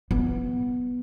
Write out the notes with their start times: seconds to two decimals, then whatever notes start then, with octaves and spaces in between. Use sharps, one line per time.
0.11 B3